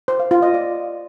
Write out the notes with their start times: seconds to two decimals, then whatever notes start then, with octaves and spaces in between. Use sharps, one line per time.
0.08 C5
0.20 F5
0.31 F4
0.42 D#5
0.54 D5